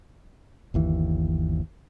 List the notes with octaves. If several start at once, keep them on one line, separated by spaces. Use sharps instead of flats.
G1 D#2 E3